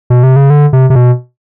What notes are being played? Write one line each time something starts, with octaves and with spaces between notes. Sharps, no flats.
B2
C3
C#3
D3
C3
C3
B2